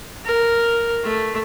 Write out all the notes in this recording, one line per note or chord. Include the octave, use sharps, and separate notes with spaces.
A#4
A3